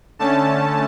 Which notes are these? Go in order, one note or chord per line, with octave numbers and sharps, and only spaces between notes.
D3 A3 C#4 A5